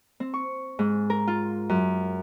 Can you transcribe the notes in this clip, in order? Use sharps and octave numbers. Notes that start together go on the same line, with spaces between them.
C4
C#6
G#2
A#4
F4
F#2